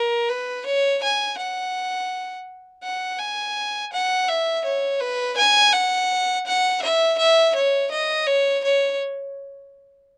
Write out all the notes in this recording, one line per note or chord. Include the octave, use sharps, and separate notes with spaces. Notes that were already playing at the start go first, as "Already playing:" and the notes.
Already playing: A#4
B4
C#5
G#5
F#5
F#5
G#5
F#5
E5
C#5
B4
G#5
F#5
F#5
E5
E5
C#5
D#5
C#5
C#5